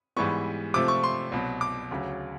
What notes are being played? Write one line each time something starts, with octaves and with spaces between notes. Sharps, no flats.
G#2 E3 G3 B3 C#6
C3 F3 A3 D6
C#6
C6
C2 B2 F#3
D6
D2 C#3 F#3